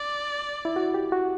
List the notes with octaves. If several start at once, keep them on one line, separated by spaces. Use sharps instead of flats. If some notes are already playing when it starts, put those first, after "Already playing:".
Already playing: D5
E4
F#4
G4
F#4